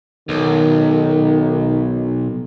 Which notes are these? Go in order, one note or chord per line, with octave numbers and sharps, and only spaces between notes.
B1 D#3